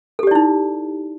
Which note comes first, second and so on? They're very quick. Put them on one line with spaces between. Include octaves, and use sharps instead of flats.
A4 G4 D5 E4 D#4